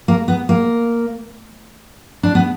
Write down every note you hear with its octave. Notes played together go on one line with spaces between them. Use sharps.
A#3
B3
A#3
D4
B3